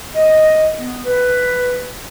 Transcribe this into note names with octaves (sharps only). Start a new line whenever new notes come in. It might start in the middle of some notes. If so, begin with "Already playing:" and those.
D#5
B3
B4